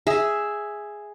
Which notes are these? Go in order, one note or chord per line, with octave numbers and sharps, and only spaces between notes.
G#4 E5